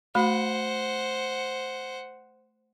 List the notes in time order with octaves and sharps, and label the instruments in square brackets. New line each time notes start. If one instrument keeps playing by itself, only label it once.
[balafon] A3 F#4 B5 [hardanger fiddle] C5 F#5